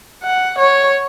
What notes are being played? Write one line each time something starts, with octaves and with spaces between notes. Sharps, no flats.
F#5
C#5